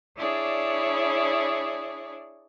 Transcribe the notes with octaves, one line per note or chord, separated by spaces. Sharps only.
D4 E4 G#4 C#5 D5